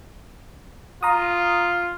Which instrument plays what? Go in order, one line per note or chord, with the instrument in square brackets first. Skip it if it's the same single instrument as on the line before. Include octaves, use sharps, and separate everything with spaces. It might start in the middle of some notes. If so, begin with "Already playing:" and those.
[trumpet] F4 [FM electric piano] A#5 D#6